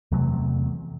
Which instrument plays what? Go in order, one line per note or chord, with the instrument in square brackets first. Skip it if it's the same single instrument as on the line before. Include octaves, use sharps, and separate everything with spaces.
[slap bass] E2 C3 F#3 A3